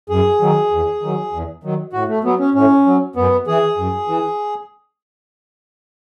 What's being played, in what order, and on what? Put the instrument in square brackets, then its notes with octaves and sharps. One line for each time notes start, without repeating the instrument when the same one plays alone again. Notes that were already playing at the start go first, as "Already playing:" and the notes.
[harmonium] F#2 G#4
D#3 F#3
E2
D#3 F#3
E2
D#3 F#3
A2 F#4
A3
F#3 B3
C#4
A2 C#4
F#3
F#2 B3
E3 G#4
F#2
E3